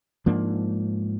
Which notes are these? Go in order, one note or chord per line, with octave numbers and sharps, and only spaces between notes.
G#2 F3 A#3 D4